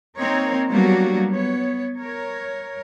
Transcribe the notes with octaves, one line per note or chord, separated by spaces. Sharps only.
A#3 C4 D#4 A#4 C#5
F#3 G3 A#3 B3 D4 F#4
B3 C#5
A#4 C#5